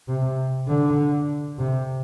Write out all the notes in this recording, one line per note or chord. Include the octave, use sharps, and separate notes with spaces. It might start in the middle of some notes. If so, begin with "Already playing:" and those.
C3
D3
C3